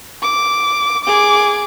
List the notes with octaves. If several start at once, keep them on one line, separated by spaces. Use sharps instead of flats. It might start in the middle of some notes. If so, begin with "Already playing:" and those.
D6
G#4 D6